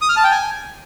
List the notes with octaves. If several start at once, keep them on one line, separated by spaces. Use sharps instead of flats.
D#6
F6
A5
G5
G#5